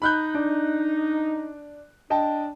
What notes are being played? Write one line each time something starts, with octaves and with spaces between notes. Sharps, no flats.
D#4 B5 F#6 G6
D4
D4 D#5 G5 A5